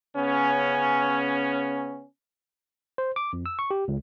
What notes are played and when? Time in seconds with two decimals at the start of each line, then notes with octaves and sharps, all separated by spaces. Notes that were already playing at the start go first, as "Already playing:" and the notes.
0.16 C#3 B3 C#4
2.98 C5
3.16 D6
3.33 F2
3.46 E6
3.59 C#6
3.71 G4
3.88 C#2